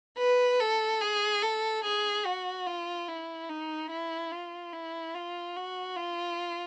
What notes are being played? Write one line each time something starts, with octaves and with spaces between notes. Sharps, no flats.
B4
A4
G#4
A4
G#4
F#4
F4
E4
D#4
E4
F4
E4
F4
F#4
F4